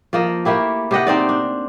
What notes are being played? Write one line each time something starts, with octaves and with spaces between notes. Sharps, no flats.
F3 A#3 D#5
A3 A#3 E4 G4
C3 G4 D#5 F#5
C4 D#4 D5
D4